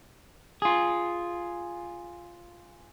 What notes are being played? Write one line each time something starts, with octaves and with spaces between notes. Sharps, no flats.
F4 G#4